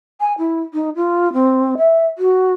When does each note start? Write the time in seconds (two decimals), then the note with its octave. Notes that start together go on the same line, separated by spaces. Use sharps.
0.20 G#5
0.38 E4
0.74 D#4
0.96 F4
1.33 C4
1.78 E5
2.18 F#4